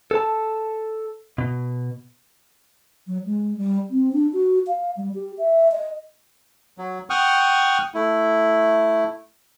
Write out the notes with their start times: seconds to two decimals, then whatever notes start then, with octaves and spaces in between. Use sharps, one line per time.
0.11 A4 A5
1.38 B2
3.07 F#3
3.25 G#3
3.57 G3
3.90 C4
4.13 D4
4.33 F#4
4.67 F5
4.97 G3
5.15 G4
5.38 E5
5.72 D#5
6.78 F#3
7.10 F#5 G5 C#6 D#6 F6
7.94 A3 E4